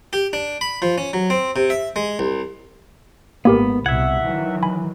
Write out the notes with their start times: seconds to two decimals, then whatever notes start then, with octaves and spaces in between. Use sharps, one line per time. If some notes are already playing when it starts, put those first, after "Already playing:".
0.13 G4
0.33 D4
0.61 B5
0.82 F3
0.98 C#4
1.13 F#3
1.30 C4
1.56 C3
1.70 E5
1.96 G#3
2.19 C2
3.45 G#1 A#3 B3 G4 A#4
3.86 C2 B2 E5 F#5 G#6
4.23 D#3 E3 F#3
4.63 G#5 B5